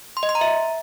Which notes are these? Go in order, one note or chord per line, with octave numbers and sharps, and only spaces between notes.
C6
D#5
C6
A#5
E5